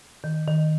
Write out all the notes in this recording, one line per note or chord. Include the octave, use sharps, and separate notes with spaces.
D#3
D#3